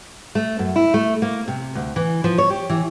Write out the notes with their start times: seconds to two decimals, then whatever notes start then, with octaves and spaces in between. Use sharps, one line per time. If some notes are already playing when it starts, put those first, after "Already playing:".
0.35 A3
0.59 F#2
0.76 E4
0.94 A3
1.22 A#3
1.48 C3
1.75 D2
1.96 E3
2.24 F3
2.38 C#5
2.50 G4
2.70 E3